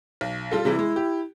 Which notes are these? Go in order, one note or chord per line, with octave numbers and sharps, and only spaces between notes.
B1
G3 F4 A4
C3 E3 G3 E4
G#3
G4